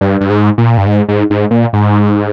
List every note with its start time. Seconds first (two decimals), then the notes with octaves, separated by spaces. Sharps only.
0.01 G2
0.21 G2
0.30 G#2
0.58 A#2
0.78 G2
0.87 G#2
1.08 G#2
1.30 G#2
1.51 A#2
1.73 G#2